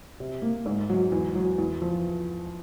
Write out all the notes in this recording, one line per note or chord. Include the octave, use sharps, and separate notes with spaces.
C3
A#3
G#2
F#3
E2
F#3
E2
F3